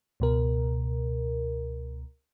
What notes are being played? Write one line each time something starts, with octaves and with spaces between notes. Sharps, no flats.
C#2 B2 A#4